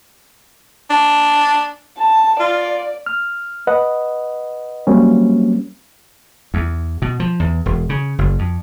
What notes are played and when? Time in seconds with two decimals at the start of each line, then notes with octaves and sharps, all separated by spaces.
0.90 D4
1.98 A5
2.40 F4 D5
3.06 F6
3.67 B4 D#5 F#5
4.87 F#3 G3 A#3 C4 C#4
6.54 E2
7.02 B2
7.20 F3
7.40 E2
7.66 E1
7.89 C#3
8.18 F#1
8.39 F2